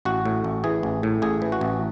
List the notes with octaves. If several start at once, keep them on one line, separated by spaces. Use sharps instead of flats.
A1 F#4
A2
A1
E3 G#4
A1
A2
A1 G#4
E3
F#4
A1